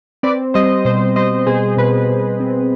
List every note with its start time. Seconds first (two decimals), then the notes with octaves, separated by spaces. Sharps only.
0.23 C4 B4 D5
0.54 G3 C5 D#5
0.85 B2 C5 D#5
1.16 G3 C5 D#5
1.47 B2 G#4 C5
1.77 B2 B4
2.09 B2
2.40 C4